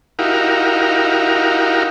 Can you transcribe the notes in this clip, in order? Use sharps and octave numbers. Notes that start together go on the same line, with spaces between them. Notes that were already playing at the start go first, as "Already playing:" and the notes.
D#4 E4 F#4 G4 A#4 F5